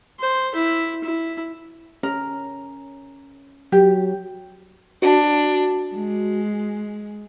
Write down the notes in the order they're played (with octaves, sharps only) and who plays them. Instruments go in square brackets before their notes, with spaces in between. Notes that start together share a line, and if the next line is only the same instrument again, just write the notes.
[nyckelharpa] C5
E4
E4
[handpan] C#4 [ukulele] A#4
[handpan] F#3 [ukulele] G4
[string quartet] D4 [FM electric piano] F#4
[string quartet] G#3